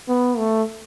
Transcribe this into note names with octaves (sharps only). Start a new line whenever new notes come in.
B3
A3